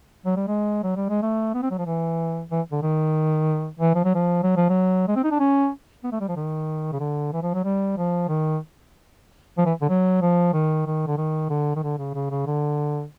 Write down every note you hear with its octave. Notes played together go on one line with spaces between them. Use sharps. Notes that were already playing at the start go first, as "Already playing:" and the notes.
F#3
G3
G#3
F#3
G3
G#3
A3
B3
C4
F#3
F3
E3
E3
D3
D#3
E3
F3
F#3
F3
F#3
F3
F#3
G#3
C4
D#4
D4
C#4
B3
A3
G3
F3
D#3
C#3
D3
E3
F3
F#3
G3
F3
D#3
F3
E3
D3
F#3
F3
D#3
D#3
D3
D#3
D3
D#3
D3
C#3
C#3
C#3
D3